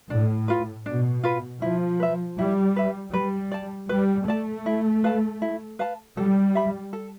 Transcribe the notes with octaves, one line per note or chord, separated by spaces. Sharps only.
A2 D4
F4 B4
B2 D4
F4 B4
F3 E4
B4 E5
G3 E4
B4 E5
G3 B4
D5 A5
G3 B4
A3 D5 A5
E4
B4 F5 A5
E4
B4 F5 A5
G3 A4
E5 B5
A4